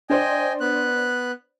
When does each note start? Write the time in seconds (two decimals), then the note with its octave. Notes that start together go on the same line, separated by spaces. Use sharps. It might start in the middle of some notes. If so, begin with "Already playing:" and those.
0.10 D4 C5 D5 D#5 G5 G#5
0.60 B3 F#6